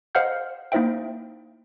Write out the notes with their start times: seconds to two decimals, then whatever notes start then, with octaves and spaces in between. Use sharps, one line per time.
0.15 C5 D#5 F5 F#5 F6 G6
0.72 A#3 D#4 E4 C5 E5 G5